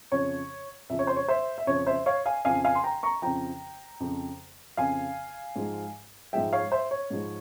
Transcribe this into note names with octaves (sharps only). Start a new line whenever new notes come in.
F2 C#3 F3 C#5
F2 C#3 F3 E5
C#5
C5
C#5
C5 E5
E5
F2 C#3 F3 C#5
C5 E5
C#5 F5
F5 G#5
F2 C#3 F3 F5 G#5
F5 G#5
C6
G5 A#5
A#5 C#6
F2 C#3 F3 G5 A#5
F2 C#3 F3
F2 C#3 F3 F5 G#5
G#2 F3 G#3
G#2 F3 G#3 E5 G5
C#5 F5
C5 E5
C#5
G#2 F3 G#3